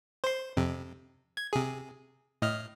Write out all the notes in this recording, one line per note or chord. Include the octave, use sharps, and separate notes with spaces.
C5 C6
F2 C3
G#6
C3 G#4
A2 D#5 F6